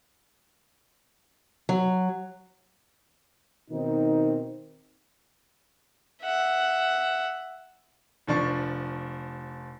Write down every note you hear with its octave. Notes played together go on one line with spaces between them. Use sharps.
F#3
B2 D#3 C4 D#4
E5 F#5
F1 F3 D4 C#6